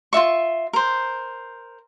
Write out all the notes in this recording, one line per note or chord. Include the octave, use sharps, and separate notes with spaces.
F4 F#4 E5 C#6
A#4 C5